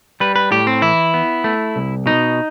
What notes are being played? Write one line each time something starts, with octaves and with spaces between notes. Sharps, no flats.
G3 B4
B4
A2 G4
C4
E3 E4
B3
A3
C2
B2 D#4